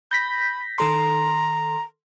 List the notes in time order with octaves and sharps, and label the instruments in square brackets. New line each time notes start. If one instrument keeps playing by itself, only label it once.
[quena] B5 [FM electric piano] G6 A#6 B6
[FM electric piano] D#3 A4 C6 [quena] A#5